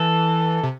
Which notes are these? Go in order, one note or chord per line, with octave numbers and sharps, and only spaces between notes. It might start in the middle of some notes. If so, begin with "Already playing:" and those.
Already playing: E3 A4
C3